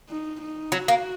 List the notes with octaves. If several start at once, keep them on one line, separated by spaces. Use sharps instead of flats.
D#4
D#4
F#3 F#4
A#3